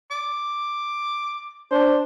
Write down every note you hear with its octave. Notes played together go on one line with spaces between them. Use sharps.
D6
D4 C5